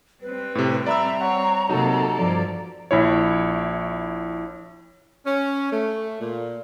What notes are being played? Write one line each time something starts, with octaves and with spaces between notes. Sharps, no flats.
G3 C4 B4
A2 C3
D5 E5 A#5 B5 E6
C#5 F#5
C3 F#3 A#3 D#4 F#4 A4
G2 F3 D5
A#1 E4 C#5
C#4
A3
A#2